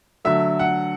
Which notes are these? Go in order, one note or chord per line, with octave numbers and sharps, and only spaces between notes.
D3 F#3 A3 E5
F#5